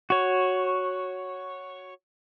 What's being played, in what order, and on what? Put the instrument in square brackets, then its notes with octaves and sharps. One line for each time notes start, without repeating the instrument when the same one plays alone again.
[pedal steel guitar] F#4 C#5